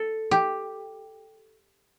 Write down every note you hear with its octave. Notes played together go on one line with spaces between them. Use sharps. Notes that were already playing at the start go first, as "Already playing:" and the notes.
Already playing: A4
G4